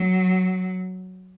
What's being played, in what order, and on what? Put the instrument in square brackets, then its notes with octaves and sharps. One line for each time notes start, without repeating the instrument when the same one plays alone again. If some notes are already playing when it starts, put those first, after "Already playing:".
Already playing: [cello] F#3